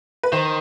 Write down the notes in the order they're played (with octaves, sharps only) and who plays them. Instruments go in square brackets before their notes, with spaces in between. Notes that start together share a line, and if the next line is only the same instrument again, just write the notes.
[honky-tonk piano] B4
[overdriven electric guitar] D#3 [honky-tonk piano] C5